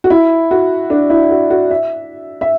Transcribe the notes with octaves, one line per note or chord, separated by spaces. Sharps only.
F#4
E4
F#4
D4
E4
F#4
F#4
E5
E5